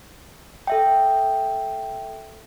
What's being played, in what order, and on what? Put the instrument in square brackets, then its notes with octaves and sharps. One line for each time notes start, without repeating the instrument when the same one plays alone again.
[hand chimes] A4 E5 G5